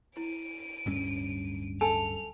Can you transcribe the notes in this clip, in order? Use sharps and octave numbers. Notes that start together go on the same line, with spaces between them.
E4 D7 D#7
D1 G2 C#4
A4 G#5 F7